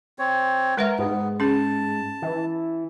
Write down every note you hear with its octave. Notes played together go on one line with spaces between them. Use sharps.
C4 C#5
G#3 A#4 B4 E5
G#2 B3
C#4 G#4 A5
E3